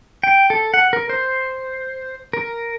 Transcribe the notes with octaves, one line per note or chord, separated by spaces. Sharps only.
G5
A4
F#5
A#4
C5
A#4